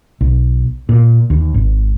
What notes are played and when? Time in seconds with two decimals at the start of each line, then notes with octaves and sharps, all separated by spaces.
0.21 B1
0.89 A#2
1.30 D#2
1.54 G#1